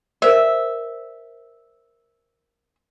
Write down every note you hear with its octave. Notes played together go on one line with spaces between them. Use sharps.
A#4 C5 D5 E5